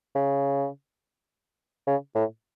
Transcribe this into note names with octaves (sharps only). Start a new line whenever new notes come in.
C#3
C#3
A2